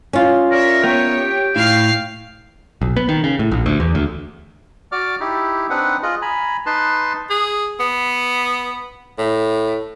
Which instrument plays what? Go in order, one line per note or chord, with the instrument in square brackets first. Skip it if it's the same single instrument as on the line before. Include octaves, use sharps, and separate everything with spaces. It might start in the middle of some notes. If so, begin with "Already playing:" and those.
[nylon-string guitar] C#4 F4
[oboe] A#4 [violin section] C#5 D5 E5
[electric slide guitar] B3 A#4 [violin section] C#5 [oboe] G5
[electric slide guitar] G4
[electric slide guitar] A2 E4 [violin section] F5 F6 C7
[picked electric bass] B1
B3
D#3
C#3
A2
A#1
D2
E2
D2
[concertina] F#4 D5 D6 F6
D#4 E4 G4
C4 D4 D#4 B4 F#5
F4 G#4 D#5
G#5 A#5 B5
D#4 B4 A5 C6
[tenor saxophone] G#4
B3
A2